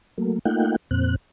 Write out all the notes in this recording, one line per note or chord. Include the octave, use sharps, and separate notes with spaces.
F#3 A3 A#3
A3 A#3 D#4 F4 F#5 G5
F2 A#2 C4 F#6